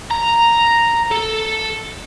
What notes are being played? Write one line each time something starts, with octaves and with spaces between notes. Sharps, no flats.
A#5
A4